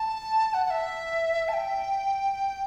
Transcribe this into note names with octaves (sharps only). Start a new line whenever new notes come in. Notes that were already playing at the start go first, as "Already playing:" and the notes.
Already playing: A5
F#5
F#5
E5
A5
G5